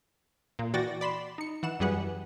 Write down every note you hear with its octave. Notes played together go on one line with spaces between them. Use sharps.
A#2
E3 F#4 D5 G5 A6 A#6
D5 B5 C6 E7
D#4 C#7
E3 F#5 E7
F#2 E3 G3 G#4 B4 F#5